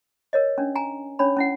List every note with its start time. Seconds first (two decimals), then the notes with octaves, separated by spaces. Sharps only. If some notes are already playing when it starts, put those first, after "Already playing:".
0.33 A#4 C#5 D#5
0.58 C#4 D4
0.75 G#5 A#5
1.19 C#4 D4 C#5 B5
1.37 C#4 E4 F#5